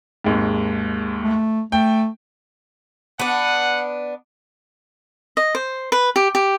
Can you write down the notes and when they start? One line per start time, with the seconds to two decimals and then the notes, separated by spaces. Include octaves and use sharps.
0.24 G#1 D#2 G#2
1.23 A3
1.72 A3 G5
3.19 B3 D4 F#5
5.37 D#5
5.55 C5
5.92 B4
6.16 G4
6.35 G4